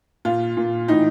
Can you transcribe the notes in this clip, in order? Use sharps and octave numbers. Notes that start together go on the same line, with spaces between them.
A#2 F4
A#2
A2 E3 D#4